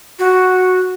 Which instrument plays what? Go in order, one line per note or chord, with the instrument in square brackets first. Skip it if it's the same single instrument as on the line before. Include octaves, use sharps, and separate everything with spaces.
[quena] F#4